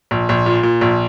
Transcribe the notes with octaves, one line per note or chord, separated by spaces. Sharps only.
A#1
A#1
A#2
A#2
A#1